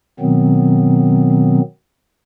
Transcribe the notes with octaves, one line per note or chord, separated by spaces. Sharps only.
B2 D#3 F#3 B3 C4